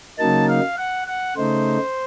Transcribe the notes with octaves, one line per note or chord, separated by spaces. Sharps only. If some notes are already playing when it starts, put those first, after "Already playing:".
C#3 F#3 A#3 D#4 A5
F5
F#5
F#5
C#3 A3 D#4 C5